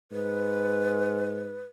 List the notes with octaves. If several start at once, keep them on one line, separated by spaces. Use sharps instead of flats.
G#2 B4